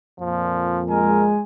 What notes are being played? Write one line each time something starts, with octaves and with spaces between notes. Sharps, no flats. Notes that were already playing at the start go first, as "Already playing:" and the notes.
F2 A#2 F3
G#3 A#4 G#5